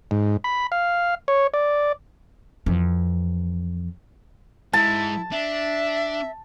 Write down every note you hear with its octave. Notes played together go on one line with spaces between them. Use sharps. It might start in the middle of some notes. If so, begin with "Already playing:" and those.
G#2
B5
F5
C#5
D5
F2 E3
G#2 G#3 E4 A5
D4 E5